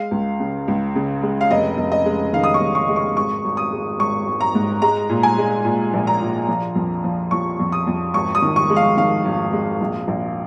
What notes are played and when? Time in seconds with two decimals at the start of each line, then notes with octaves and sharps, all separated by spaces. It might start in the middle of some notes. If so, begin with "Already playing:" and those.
Already playing: G#3 F5
0.11 C#2
0.40 C#3
0.68 C#2
0.95 C#3
1.23 G#3
1.41 F5
1.51 F1 D#5
1.77 F1
1.92 D#5
2.05 G#3
2.33 D#3 F5
2.44 D#6
2.54 C#6
2.61 F1
2.75 C#6
2.89 G#3
2.96 C#6
3.17 G#1 C#6
3.44 G#1
3.57 D#6
3.72 G#3
3.99 G#1 C#6
4.27 G#1
4.41 A#5
4.55 G#2
4.82 G#3 A#5
5.09 A#2
5.23 G#5
5.38 G#3
5.65 A#2
5.94 A#1
6.07 A#5
6.21 A#2
6.48 F3
6.75 F2
7.04 F3
7.31 F3 C#6
7.59 F2
7.72 D#6
7.87 F2
8.14 G#1 C#6
8.35 D#6
8.42 D#3
8.56 C#6
8.70 G#3
8.76 F5
8.97 D#3 F5
9.25 G#1
9.53 G#3
9.81 A#1
10.08 A#1